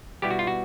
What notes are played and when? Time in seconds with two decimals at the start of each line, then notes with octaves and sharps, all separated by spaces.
0.22 B2 G3 B3 E4 G4
0.30 F#4
0.39 F4
0.47 F#4